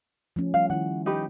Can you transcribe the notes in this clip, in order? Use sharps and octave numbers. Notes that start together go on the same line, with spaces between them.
F3 A3 C#4
G3 F5
D#3 E4 F#5
D#4 G4 B4